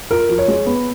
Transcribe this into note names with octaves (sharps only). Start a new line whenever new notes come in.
F4 A#4
F3
C#5
G#3
B3